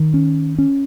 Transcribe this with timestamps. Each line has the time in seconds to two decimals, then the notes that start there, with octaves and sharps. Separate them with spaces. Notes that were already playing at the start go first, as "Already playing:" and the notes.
Already playing: D#3
0.14 C#4
0.58 C#4